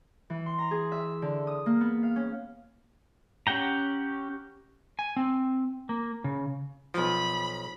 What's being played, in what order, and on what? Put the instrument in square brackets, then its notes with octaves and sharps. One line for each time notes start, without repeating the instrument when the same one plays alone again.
[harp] E3
C6
A#5
G#4
E5
D3
D#6
A#3
B3
F5
C#4
[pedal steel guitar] C#4 G4 F#5 G5 A#5
[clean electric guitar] G#5
C4
A#3
C#3
[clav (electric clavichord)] B1 F3 [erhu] B5